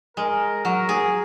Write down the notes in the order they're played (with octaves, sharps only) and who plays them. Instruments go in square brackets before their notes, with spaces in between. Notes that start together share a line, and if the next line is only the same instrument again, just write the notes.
[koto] G#3 [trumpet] A#4
[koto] F#3 [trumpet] A#4
[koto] G#4